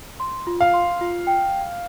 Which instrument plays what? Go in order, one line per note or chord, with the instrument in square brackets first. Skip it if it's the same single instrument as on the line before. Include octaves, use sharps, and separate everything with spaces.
[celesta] C6
F4
[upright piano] F5
[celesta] C6
F4
G5